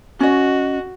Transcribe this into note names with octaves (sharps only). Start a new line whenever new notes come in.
C#4 F#4 D#5